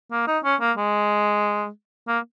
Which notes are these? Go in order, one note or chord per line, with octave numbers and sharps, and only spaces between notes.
A#3
D#4
C#4
A#3
G#3
A#3